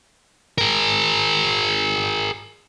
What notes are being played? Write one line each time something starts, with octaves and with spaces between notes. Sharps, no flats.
G#4 A#4